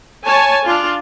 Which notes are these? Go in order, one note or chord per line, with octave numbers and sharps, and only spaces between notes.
C#5 G#5 A5
D4 F4